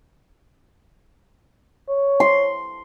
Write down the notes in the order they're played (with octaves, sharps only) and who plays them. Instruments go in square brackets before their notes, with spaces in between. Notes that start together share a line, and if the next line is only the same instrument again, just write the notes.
[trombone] C#5
[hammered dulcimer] C6